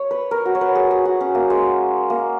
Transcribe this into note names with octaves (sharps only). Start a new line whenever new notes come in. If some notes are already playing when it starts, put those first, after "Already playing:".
Already playing: C#5
B4
A#4
F#4
C#5
B4
G#4
G#4
F#4
C#4
A#3
G#3
A#3